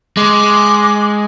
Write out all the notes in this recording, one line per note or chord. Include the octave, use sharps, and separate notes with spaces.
G#3 D6